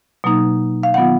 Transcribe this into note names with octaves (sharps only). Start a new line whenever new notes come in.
B2 F#3 A#3 D#4
F5
D#3 F#3 B3 F4 F#5